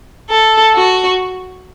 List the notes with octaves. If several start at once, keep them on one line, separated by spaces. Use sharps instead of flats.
A4
F#4